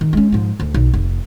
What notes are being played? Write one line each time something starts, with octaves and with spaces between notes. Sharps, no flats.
D#3
G#3 C#4
G#2 F3
D2
B1
F1